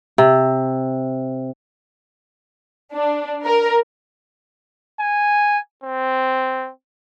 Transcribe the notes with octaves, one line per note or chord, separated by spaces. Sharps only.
C3
D4
A#4
G#5
C4